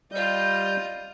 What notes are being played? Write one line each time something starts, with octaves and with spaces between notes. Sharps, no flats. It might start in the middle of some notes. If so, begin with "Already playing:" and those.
G3 F4 D#5 G6